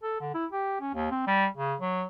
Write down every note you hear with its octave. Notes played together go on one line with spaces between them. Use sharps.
A4
D3
E4
G4
C#4
D#2
C4
G3
C#3
F#3